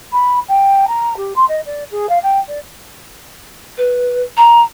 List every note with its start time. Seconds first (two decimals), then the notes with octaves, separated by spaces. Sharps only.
0.12 B5
0.48 G5
0.87 A#5
1.17 G4
1.36 C6
1.48 D#5
1.65 D5
1.91 G#4
2.09 F5
2.22 G5
2.47 D5
3.77 B4
4.37 A#5